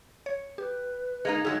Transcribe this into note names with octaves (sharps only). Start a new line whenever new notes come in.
C#5
G4 B4
G#3 A#3 D#4
G2 F#3 G#3 D#4 G#4 E6